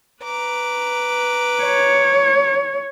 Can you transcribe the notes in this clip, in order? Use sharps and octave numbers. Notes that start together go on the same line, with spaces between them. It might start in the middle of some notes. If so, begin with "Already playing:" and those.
B4 A#5 D6
C#5